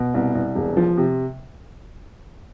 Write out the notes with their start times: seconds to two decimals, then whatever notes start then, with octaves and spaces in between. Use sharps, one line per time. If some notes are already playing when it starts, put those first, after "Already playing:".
Already playing: B2
0.14 C2
0.35 C2
0.55 E1
0.77 F3
0.97 C3